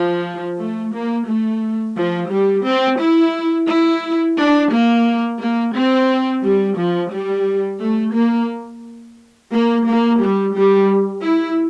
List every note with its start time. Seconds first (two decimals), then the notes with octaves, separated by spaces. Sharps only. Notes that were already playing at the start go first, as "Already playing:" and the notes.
Already playing: F3
0.59 A3
0.94 A#3
1.28 A3
1.97 F3
2.31 G3
2.65 C4
3.00 E4
3.68 E4
4.37 D4
4.71 A#3
5.40 A#3
5.74 C4
6.43 G3
6.77 F3
7.12 G3
7.80 A3
8.15 A#3
9.52 A#3
9.86 A#3
10.20 G3
10.55 G3
11.24 E4